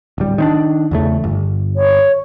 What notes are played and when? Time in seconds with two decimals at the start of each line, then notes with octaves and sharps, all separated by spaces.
0.18 D1 G3
0.38 D#3 C4 D4
0.91 E2 C#3 A3
1.24 G1
1.76 C#5